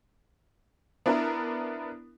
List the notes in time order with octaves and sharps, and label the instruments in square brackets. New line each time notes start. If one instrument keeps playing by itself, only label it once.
[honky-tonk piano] B3 D4 E4 A#4